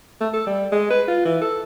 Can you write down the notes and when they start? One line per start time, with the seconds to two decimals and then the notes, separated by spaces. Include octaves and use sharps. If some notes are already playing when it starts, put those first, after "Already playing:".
0.21 A3
0.33 A4
0.46 G3
0.72 G#3
0.90 B4
1.08 F4
1.25 E3
1.41 A4